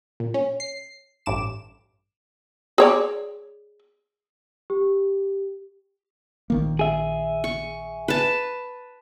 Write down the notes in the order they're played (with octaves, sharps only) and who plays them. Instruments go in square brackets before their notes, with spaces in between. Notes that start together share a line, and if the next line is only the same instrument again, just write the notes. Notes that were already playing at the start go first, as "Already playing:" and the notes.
[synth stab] A#2
C#4
C7
A1 G2 D6 E7
[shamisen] G#4 C#5 D5
[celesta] G4
[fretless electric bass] A#1 D#3 A#3
[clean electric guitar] G#4 E5
[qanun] C#6
B4 A5